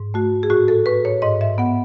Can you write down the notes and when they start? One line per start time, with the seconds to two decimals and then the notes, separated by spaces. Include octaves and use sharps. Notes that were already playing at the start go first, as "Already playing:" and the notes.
Already playing: G#2
0.14 A3 F#4
0.43 G#4
0.50 A2 F#4
0.68 A4
0.86 A2 B4
1.05 C#5
1.22 G#2 D#5
1.41 E5
1.58 B3 F#5